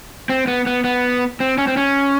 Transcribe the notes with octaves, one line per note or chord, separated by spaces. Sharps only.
C4
B3
B3
B3
C4
C#4
C4
C#4